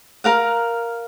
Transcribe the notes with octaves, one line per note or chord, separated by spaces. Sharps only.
A#4 F5 F#5